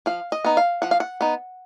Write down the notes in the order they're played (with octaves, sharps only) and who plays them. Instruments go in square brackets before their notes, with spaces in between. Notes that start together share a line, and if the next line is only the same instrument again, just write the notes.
[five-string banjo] F3 F5
D#5
B3 D#4
F5
F3 F#5
F5
F#5
B3 D#4